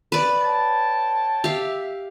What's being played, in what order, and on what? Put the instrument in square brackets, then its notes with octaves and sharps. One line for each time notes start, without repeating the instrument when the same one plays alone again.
[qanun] B4 D5
[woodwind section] C#5 G5 A5
[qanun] G4 F5 [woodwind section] E5